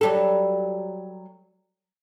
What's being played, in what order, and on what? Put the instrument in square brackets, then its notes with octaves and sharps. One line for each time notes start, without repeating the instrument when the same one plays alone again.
[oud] F#3 G3 A4